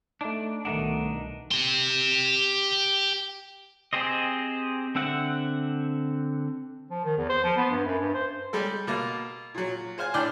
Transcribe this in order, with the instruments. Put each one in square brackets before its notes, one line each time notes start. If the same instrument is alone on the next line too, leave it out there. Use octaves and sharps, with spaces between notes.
[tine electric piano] A3 D#4 [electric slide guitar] D4
[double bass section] C2 B2 D#3 [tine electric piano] A3 F#5 [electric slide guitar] D4 D#4
[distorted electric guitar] G4 C6
[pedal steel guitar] C4 G4 G#4 C5 D#5
D3 C4 E5 F#5
[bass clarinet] F3
D#3
E2
C5
F3
B3
G2
F#2
G2
C5
[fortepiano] G3 G#3 A4
B2 A#3
A#2 F#3
G#4 C5 F5 G#5
A2 D4 D5 G5 F6